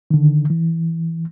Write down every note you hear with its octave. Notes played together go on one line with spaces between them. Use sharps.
D3 D#3
E3